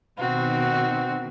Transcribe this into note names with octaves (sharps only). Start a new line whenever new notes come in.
B2 D#3 C4 F#4